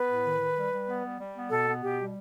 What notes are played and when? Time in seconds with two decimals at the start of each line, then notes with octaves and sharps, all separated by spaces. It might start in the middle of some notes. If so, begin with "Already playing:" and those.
Already playing: B3 B4
0.08 A2
0.24 D#3
0.40 D#3
0.56 G3
0.71 G3
0.88 B3
1.03 G3
1.19 G3
1.35 B3
1.51 B2 A4
1.67 B3
1.83 B2 G4
1.99 G3